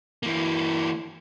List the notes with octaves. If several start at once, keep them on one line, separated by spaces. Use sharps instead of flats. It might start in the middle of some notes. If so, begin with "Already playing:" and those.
E3 A#3